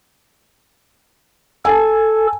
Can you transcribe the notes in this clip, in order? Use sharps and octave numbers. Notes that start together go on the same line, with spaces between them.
A4 G#5 A5